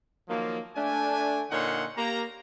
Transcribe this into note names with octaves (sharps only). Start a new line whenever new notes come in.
D#3 F3 F#3 A#3
A3 D4 G#5
A#2 D3 D#4 C#5 F#5 C6
A#3 G4 A#5